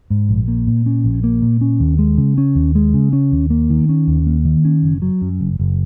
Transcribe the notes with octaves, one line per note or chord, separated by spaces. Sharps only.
G#2
A#1
A#3
A#2
C#4
A#1
A#3
A#2
C#4
D#2
G#3
C#3
C#4
D#2
G#3
C#3
C#4
D#2
A#3
D#3
C#4
D#2
A#3
D#3
C#4
F#1
F#3
F#2
F#1
F#1